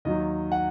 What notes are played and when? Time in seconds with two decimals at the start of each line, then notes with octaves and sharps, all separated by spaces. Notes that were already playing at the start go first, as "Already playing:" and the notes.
0.05 D#2 D#3 F#3 D#5
0.52 F#5